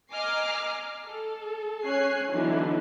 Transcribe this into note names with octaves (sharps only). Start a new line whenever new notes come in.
D#5 G#5 A#5 D6 F6 C7
A4
C#4 C#5 G#5 F#6 C7
D3 E3 F#3 B3 D#4 E4